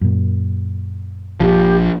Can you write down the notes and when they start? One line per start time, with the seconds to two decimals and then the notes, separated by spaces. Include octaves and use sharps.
0.01 F#2 A#2
1.40 A#1 F3 G4